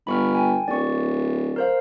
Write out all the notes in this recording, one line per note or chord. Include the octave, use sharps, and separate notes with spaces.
G1 B5 C#6 F6
G5 G#5
D1 D5 C#6
A#4 C5 F5